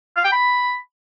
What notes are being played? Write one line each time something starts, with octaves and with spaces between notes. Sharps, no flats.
F5
G5
B5